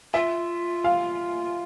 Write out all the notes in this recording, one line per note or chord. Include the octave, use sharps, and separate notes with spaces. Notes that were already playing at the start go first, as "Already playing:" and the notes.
F4 E5
F5